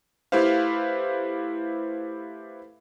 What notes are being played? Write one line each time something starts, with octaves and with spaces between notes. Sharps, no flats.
A3 E4 G4 B4 C5 F5